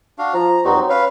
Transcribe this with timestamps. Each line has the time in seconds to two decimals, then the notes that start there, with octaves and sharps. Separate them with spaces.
0.18 D4 F#4 F5
0.34 F3 A#5
0.65 G2 C4 D#4 F#4
0.76 F#3
0.90 C#4 B4 F5